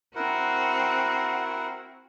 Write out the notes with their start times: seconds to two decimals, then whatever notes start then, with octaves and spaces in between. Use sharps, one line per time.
0.15 C4 E4 F#4 A#4 F#5